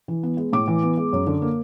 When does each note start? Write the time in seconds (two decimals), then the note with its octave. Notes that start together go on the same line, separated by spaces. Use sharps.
0.08 E3
0.23 B3
0.37 G#3
0.53 A2 D6
0.68 E3
0.83 B3
0.97 G#3
1.13 F#2
1.27 D3
1.42 A#3